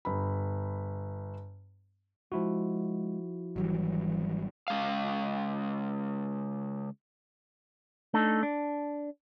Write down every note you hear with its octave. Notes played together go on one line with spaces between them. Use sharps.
G1 B5
F3 G#3 E4 F#4
G#1 E3 F#3 G3
C#3 G#3 F5
A3 D4 D#4 A4
D4